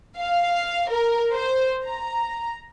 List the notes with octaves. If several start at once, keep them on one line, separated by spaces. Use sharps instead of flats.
F5
A#4
C5
A#5